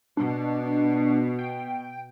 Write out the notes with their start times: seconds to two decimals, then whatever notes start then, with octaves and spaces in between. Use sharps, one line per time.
0.17 B2 D4
1.39 G5